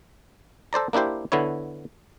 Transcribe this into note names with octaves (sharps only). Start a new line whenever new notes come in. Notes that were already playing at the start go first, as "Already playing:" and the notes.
A4 C5 D5 A#5
A#3 D4 E4 G4 C5
D3 B3 E4 C#5